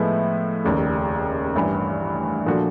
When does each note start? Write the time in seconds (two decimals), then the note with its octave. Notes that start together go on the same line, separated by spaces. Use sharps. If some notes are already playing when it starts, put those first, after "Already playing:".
Already playing: A2 F3 G#3 B3 E4
0.64 F1 D#2 C#3
1.55 A1 G2 E3
2.46 A#2 F3 A3 D4 F#4